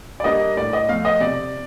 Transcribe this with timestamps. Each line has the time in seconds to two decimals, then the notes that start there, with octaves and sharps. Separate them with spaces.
0.20 D5
0.24 G3 A#3 D4 D#5
0.57 A2 D5
0.73 D#5
0.89 F3 A3 F5
1.05 D#5
1.20 C3 D5